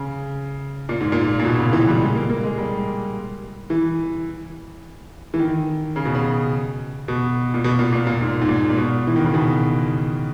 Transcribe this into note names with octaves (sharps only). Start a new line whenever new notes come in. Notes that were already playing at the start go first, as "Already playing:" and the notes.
Already playing: C#3
A#2
G#2
A#2
A#2
B2
C#3
E3
G3
G#3
A#3
A#3
G#3
G3
E3
E3
D#3
C#3
B2
C#3
B2
A#2
B2
A#2
A#2
A#2
G#2
G#2
A#2
A#2
B2
E3
D#3
C#3
B2